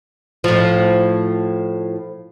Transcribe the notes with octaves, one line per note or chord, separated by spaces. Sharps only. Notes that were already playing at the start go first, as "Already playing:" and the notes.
A2 F3